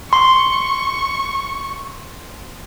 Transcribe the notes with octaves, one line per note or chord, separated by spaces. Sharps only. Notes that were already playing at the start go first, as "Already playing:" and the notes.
C6 C#6